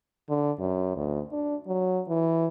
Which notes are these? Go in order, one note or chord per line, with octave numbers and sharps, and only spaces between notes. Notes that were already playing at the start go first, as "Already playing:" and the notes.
D3
F#2
D2
D4
F#3
E3